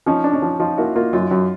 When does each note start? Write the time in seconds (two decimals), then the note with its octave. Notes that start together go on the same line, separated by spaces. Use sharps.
0.06 F3 C#4 D#4
0.24 D4
0.33 C#4 D#4
0.42 F3
0.60 F3 D#4 F4
0.78 A#3 E4 F#4
0.95 A#3 D#4 F4
1.13 F#2 D#4 F4
1.31 F#2